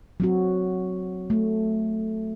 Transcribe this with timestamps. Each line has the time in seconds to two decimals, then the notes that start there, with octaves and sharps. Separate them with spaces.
0.20 F#3 C4 F#4
1.30 A3